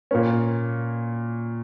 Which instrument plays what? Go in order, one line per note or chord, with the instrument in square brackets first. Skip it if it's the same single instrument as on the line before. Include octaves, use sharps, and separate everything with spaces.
[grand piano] A#2 A#3 C#4